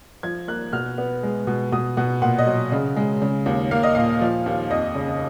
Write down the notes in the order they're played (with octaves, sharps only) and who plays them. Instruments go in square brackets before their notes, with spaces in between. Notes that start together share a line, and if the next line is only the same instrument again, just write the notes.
[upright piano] F3 G#6
A#3 F#6
B2 F6
B3
G#3
B2
B2 D#6
B2 F#5
A#2 F#5
D#5
F#3
C#3
G#3
C#3
D#2
A#3 F5
D#5
A#2 F5
F3
D#2
F2 D#5
C#3